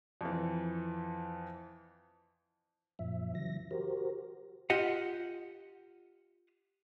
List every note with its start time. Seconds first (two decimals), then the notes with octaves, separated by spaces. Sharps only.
0.21 F2 E3
2.99 F#2 A#2 F3 E5
3.35 C#3 E3 F#3 A#6
3.71 F#4 G4 A#4 C5
4.70 F4 G4 D#5 F#5